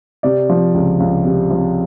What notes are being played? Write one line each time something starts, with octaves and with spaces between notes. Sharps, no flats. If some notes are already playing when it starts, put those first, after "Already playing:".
C3 D5
F3
C#2
C#2
C3
F3